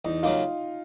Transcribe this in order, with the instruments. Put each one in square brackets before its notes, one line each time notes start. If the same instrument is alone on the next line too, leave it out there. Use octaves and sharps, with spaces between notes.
[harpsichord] E2 [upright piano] D#4
[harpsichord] C#3 F#3 A#3 D#4 [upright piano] F4